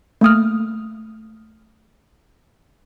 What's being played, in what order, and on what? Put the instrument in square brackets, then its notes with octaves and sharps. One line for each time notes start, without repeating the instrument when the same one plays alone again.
[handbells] A3 A#3 D#6 F6